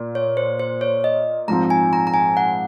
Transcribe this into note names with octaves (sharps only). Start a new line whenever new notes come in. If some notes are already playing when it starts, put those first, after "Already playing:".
Already playing: A#2
C#5
C5
C5
C#5
D#5
G#2 F3 C4 A#5
G#5
A#5
A#5
G#5
F#5